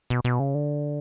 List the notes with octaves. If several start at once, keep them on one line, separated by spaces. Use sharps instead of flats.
B2
B2
C#3
D3